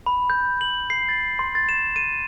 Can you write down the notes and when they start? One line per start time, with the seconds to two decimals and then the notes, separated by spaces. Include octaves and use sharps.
0.06 B5
0.30 G6
0.61 F#7
0.90 C7
1.09 A6
1.39 C6
1.55 A6
1.69 E7
1.96 D#7